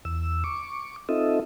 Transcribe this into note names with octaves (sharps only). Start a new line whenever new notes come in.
E2 E6
C#6 D6
C4 D#4 F4 A4 D#5 E5